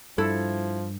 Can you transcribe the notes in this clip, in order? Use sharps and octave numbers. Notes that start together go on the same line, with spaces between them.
G2 F3 E4 A4